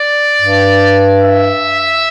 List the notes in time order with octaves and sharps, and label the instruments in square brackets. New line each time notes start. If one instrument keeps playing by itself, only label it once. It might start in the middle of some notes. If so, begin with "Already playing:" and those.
Already playing: [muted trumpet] D5
[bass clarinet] G2
[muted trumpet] E5